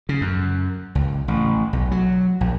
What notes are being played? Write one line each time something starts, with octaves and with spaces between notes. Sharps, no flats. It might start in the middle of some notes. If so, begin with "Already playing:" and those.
C#3
F#2
C#2
A1
B1
F#3
A#1